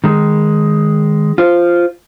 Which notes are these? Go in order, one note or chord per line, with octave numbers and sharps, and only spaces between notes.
D#3 G#3
F4 C5